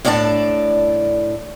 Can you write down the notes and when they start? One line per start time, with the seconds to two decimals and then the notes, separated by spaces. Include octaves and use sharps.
0.05 A2 D4 D5 F5 A5